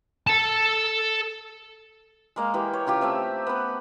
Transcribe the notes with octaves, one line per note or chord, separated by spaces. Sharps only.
A4 A5
G#3 A#3 F5
E3 G4
C#5
C#3 F4 G4
A3 C4 E5
B3 B4